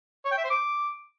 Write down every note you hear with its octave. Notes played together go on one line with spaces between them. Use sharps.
C#5
G5
E5
C5
D6